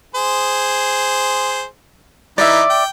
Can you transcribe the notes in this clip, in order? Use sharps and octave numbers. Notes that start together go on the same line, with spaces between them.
G#4 C5
E3 D#4 D5 E5
G5